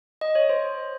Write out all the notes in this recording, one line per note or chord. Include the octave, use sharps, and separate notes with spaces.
D#5
C#5
C5